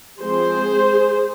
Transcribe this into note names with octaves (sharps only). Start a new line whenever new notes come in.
F3 G#3 C4 G#4 C5